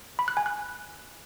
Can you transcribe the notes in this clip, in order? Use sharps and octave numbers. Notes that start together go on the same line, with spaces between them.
B5
F#6
G#5
F#6